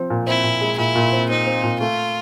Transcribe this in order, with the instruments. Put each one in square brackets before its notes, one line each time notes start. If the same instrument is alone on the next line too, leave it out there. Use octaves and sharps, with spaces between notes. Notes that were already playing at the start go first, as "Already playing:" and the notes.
Already playing: [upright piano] F3 C4
A#2
[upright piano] C4 [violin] E4
[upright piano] A#2
G#3
[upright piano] A#2 [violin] E4
[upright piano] A#2
C4
[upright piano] C4 [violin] D#4
[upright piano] C4
A#2
[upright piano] A3 [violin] F4